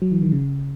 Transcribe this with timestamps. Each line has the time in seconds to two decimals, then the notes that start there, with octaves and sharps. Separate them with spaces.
0.02 F#3
0.12 E3
0.22 D#3
0.32 C#3